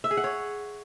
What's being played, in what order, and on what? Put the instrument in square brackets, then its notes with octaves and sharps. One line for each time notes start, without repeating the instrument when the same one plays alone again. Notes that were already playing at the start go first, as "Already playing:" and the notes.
[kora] E5
G#4
F#5
C#5